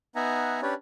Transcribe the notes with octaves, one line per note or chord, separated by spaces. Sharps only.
B3 D#4 E5 F#5 G#5 A#5
C#4 D4 G4 B4 C#5 D5